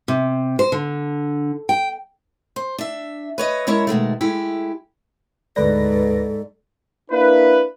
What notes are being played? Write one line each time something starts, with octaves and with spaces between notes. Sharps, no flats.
C3
C5
D3
G5
C5
D4 E5
B4 C#5 D#5
G#3 C#4 E4 A#4 C#5 E5
B2 D#3 G#3 A3
G#3 A3 E4 G4
D2 G#2 A4 B4 D5 A#6
A#3 D4 E4 B4